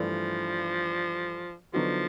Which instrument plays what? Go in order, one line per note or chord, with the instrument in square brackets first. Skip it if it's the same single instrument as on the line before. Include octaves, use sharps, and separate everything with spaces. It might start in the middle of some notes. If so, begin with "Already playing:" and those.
Already playing: [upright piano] G2 E3 A3 D4 [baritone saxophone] F3
[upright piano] D3 F#3 B3 D#4 F#4 [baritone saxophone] F3